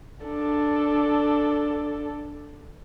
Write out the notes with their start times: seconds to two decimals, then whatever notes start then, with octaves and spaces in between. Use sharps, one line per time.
0.25 D4 A4